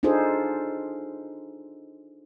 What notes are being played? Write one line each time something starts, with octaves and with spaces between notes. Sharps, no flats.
D4 D#4 F4 G#4 A4 C5